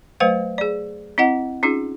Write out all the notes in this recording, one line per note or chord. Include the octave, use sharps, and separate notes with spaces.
F#3 A3 B4 C5 F5
G#4 D5
C4 E4 D#5 F#5
C#4 D#4 F4 G#4